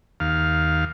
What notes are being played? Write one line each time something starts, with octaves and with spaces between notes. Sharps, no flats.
D#2 F5